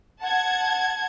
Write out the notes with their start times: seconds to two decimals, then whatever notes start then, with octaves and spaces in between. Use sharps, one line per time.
0.22 F#5 A5 G#6